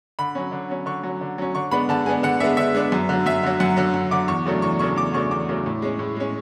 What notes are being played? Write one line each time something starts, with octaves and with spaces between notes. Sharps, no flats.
D3 B5
F#3 C#4
D3
F#3 C#4
D3 C#6
F#3 C#4
D3
F#3 C#4
D3 C#6
G#3 B3 D4 B5
D3 A5
G#3 B3 D4 G#5
D3 F#5
G#3 B3 D4 E5
D3 E5
G#3 B3 D4
F#2
D3 F#3
F#2 E5
D3 F#3
F#2 F#5
D3 F#3
F#2
D3 F#3 D6
E2 C#6
C#3 F#3 A3 D4
E2 C#6
C#3 F#3 A3 D4 C#6
E2 D6
C#3 F#3 A3 D4 C#6
E2 D6
C#3 F#3 A3 D4
A2
G#3 C#4
A2
G#3 C#4